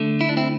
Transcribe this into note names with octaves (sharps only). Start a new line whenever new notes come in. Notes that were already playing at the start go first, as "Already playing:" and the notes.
Already playing: D3 A3
E4
D4
C4 E4